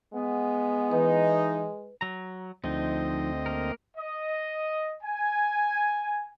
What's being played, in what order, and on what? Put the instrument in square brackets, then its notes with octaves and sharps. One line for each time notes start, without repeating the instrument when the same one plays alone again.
[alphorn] G#3 [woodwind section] B3
[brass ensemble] E3 D#4 [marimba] B4
[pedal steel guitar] F#3 A#5
[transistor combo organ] D2 C4 D#5 [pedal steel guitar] F3 D#4
[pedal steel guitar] A#3 A#4
[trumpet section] D#5
G#5